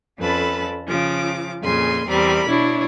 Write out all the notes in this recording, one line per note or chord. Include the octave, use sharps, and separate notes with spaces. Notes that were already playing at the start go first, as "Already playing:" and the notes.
F2 C#4 A4 B4 A5 B5
C#3 F3 D6
F2 A#2 C#3 G#5 C6
E2 G3 C4 A#4 B5
B2 D4 E4 C#5